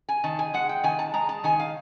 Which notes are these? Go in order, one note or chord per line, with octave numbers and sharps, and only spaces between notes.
G#5
D#3 A5
G#5
G#3 F#5
G5
D#3 G#5
A5
G#3 A#5
A5
D#3 G#5
F5